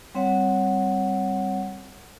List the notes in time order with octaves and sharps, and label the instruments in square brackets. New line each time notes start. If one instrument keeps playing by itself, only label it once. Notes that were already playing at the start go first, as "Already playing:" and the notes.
[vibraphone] G3 C4 C#5 F#5